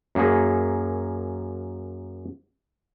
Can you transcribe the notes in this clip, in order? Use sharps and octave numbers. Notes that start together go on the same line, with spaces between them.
F#2 A#3 G#4